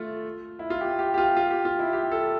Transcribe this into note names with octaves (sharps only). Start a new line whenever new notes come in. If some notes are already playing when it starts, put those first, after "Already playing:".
Already playing: A3 F4
E4
F4
G4
G4
G4
F4
F4
G4
F4
E4
G4
A4